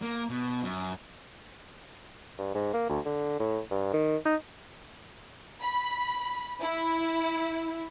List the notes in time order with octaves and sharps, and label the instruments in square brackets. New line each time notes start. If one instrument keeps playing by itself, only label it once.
[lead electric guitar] A#3
B2
F#2
[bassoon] G2
G#2
A#3
D2
D3
A2
G2
D#3
D#4
[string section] B5
E4